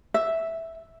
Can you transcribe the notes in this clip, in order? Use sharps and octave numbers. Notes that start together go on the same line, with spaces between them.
E5